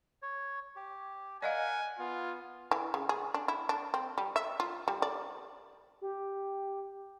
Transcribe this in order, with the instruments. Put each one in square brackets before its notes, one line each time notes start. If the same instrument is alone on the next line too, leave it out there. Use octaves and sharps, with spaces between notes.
[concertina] C#5
G4
[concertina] A#4 F#5 [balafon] D5 D#5 F5 [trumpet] G#5
[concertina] B3 [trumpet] F4
[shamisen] E3
C#3
G#4
D4
E4
D4
C4
G3
E5
F4
G3
D5
[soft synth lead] G4